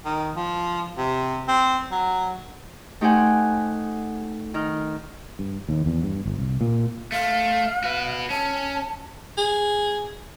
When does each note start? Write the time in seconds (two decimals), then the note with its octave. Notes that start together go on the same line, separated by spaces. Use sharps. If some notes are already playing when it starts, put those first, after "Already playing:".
0.05 D#3
0.35 F3
0.98 C3
1.48 C4
1.91 F#3
3.01 A3 D#4 G4 C5 F#5 G#5
4.54 D#3 D#4 F6
5.39 G2
5.69 D#2
5.86 E2
6.03 G2
6.26 G1
6.38 C2
6.61 A#2
7.12 A3 F5
7.84 F#4 B4
8.30 C#4 A5
9.37 G#4